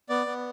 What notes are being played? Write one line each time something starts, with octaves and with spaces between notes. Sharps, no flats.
B3 D5
B3